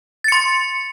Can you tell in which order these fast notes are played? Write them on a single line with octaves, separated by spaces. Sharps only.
A6 C#7 C6